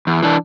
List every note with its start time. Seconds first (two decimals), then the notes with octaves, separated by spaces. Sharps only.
0.07 E2
0.23 E3 D4